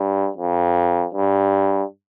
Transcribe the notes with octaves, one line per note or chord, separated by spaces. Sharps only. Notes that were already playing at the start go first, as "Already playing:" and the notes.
Already playing: G2
F2
G2